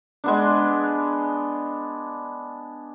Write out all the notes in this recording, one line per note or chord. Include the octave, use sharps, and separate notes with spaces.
G#3 B3 D4